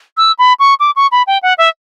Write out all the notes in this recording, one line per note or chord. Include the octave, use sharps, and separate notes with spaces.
E6
B5
C#6
D6
C#6
B5
G5
F#5
E5